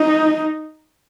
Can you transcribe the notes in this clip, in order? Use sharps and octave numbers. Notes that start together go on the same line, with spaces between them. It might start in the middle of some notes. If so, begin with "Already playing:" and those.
Already playing: D#4